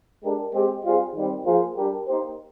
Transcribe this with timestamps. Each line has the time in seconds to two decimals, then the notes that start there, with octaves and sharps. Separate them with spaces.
0.24 G#3 D4 G4 A#4
0.54 G#3 C4 G4
0.84 G3 C4 F4 G#4 C5
1.14 D#3 G3 C4
1.45 F3 A#3 F4 G#4 C5
1.76 G3 D4 G4 A#4
2.07 A#3 D#4 G4 C5